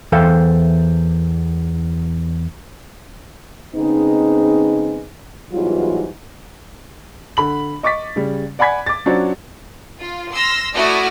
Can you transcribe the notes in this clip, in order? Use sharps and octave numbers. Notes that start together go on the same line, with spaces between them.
E2 E3 A4 C5 F5 G5
C#3 G#3 B3 C4 D#4
E2 G#2 E3 F#3 G3 F4
D3 B5 F#7
D#5 C#6 D6 A6 B6
C#3 G3
D5 F#5 G#5 B5 G#6 B6
D6 A6
F#3 C#4 D4 F4 F#4 C5
F4
C6 E6 F6 A#6
A3 E4 F#4 D5 D#6 F6